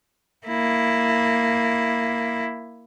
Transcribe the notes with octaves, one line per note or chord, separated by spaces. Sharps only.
A#3 E4